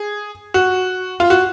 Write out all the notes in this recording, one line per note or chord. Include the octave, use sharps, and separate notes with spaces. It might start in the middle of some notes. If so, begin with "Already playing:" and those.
Already playing: G#4
F#4
F4
F#4